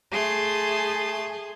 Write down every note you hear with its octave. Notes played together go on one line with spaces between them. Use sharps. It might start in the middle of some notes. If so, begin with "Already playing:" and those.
A3 G#4 C6